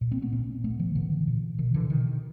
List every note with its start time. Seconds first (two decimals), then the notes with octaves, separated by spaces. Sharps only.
0.01 A#2
0.12 A#3 C4
0.22 A3 B3
0.32 A#2 B3 C#4
0.64 A2 A3 B3
0.79 D#3 F3
0.95 A2 D3 E3
1.27 A#2
1.58 B2 D#3
1.74 D3 E3
1.90 B2 D#3